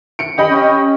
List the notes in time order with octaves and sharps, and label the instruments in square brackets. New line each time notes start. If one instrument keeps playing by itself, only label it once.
[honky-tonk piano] C#7 D7
G4 D#5 B5
[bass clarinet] C#4